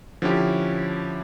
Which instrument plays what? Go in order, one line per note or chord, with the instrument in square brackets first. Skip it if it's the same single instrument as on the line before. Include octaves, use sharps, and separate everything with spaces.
[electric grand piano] D3 F3 C#4 E4 G4